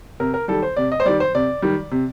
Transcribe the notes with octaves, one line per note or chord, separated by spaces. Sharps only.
C3 A#4
A#4
D#3 G3 A4
C5
C3 D5
D#5
C5
D#3 G3 D5
C5
C3 D5
D#3 G3
C3